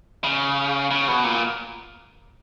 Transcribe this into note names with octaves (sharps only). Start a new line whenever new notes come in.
C#3
C#3
B2
A#2